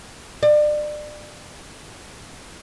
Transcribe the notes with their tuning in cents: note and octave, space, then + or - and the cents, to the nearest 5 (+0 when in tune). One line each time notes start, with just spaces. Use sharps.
D5 +30